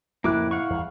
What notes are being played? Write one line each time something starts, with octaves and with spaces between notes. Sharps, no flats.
F2 A2 C#3 A#3 E4 D6 F#6
F5 F#5 C#6
E2 G3